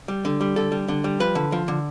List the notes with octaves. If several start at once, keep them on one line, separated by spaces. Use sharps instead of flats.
G3
D3
G3
D3 A4
G3
D3
G3
F3 B4
D3
F3
D3